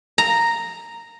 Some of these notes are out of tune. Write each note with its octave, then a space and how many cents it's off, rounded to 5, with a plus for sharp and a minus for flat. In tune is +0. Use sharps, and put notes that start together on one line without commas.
A#5 -5